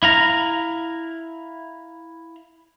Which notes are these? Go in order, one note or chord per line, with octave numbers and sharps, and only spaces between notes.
E4 F5 A#5